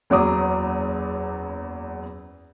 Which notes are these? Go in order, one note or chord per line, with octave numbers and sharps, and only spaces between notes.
F#1 E2 F#3 D6 D#6